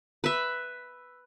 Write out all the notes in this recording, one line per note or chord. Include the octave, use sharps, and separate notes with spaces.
B4 E5